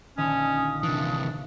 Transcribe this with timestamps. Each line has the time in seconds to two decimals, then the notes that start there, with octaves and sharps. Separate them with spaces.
0.18 A#1 D3 D#3 C#4 D#6
0.83 C3 E3 D4 E5 F5